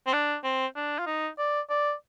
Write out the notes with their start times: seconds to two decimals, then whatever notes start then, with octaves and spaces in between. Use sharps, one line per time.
0.07 C4
0.13 D4
0.44 C4
0.76 D4
0.99 F4
1.06 D#4
1.38 D5
1.70 D5